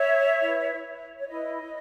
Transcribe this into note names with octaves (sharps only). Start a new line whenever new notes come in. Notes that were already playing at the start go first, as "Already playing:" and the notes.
Already playing: C#5 E5
E4 B4
C#5
E4 B4 D#5